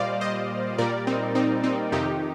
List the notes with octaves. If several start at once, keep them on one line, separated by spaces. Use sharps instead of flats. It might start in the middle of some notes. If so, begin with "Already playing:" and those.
Already playing: A#2 G3 C5 D5 D#5 F5
C5 D#5
A#2 G3 A#4 D5
C4 D#4
C4 D#4
C4 D#4
F2 C3 D#3 D#4 G4